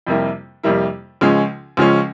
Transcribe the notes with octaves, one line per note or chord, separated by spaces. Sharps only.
F2 C3 G3 A#3 E4
F2 C3 G3 A#3 E4
C#2 C#3 F3 G#3 C#4
C#2 C#3 F3 G#3 C#4